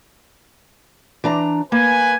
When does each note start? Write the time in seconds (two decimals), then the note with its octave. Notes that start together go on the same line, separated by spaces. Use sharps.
1.24 E3 D4 A#5
1.72 A#3 B4 G#5